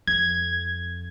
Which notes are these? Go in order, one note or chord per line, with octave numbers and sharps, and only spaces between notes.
F2 G#6